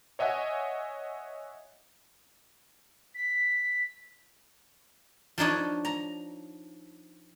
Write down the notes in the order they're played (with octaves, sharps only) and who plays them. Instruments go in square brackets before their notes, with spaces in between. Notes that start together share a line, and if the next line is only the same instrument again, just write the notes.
[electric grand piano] C#5 D#5 E5 F#5 G#5
[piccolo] B6
[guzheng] F3 D4 D#4 C#5
A#5